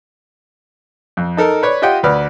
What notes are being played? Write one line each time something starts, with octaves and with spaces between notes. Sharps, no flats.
F2
D#4 A4 A#4
B4 C#5 D5
F4 G4 D#5 F#5 G5
D2 B4 D5 F6